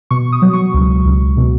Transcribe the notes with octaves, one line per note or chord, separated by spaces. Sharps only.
B2 C#6
D#6
F#3
C#6
C#2
C#2
B2